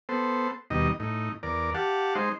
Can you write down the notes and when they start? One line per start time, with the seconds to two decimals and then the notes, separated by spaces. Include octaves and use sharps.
0.09 B3 A4 C5
0.70 D#2 B2 G3 D#4 D#5
1.00 A2 D#4
1.43 E2 A#4 D5
1.75 G4 F5 F#5 A5
2.15 G#3 D#4 C5